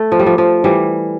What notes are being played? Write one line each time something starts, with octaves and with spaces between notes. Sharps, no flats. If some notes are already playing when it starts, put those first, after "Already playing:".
Already playing: A3
F3
G3
F3
F3
E3 G3